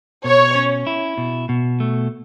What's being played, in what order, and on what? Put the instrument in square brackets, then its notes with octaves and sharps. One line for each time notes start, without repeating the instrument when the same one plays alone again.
[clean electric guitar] B2 [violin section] C#5
[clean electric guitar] C#4
E4
B2
B2
A3